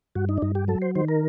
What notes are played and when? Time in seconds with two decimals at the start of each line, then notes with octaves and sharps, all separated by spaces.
0.15 G2 F#4
0.29 D#4
0.38 D4
0.42 G2 D#4
0.55 G4
0.68 F#3 A4
0.82 C5
0.95 D#3 C5
1.08 A#4